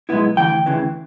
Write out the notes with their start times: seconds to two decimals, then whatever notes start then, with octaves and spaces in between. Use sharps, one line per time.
0.09 B1 B2 G#3 B3 E4
0.37 D2 C#3 E3 G5
0.66 D2 C#3 E3